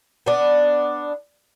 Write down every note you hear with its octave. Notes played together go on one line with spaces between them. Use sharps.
B3 D4